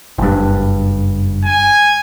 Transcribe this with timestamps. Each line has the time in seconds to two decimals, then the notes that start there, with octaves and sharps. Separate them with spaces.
0.18 F#1 G2
1.45 G#5